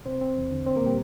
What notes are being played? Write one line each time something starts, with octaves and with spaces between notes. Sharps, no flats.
C3 C4 C5
C4
E2
D3
C4 C5
A#3 A#4
A#2 G3 G4